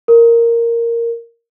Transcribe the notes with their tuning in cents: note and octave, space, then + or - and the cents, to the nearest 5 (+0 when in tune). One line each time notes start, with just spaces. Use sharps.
A#4 -5